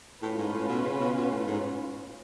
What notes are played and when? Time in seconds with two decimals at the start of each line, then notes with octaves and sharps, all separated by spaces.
0.22 A2 C#4 F4 B4
0.38 G#2
0.54 A2
0.69 B2
0.85 C#3
1.00 B2
1.16 B2
1.31 A2
1.47 G#2